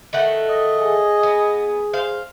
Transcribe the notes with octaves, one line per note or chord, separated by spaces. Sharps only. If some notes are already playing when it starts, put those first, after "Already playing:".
D#3 A3 F#5
D#5
G#4
B3
C5 F5